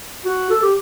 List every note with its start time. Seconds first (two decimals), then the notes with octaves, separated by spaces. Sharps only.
0.25 F#4
0.50 A4
0.63 G4